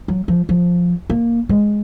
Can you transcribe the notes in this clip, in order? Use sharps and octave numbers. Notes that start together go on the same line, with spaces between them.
F#3
F3
F3
A#3
G#3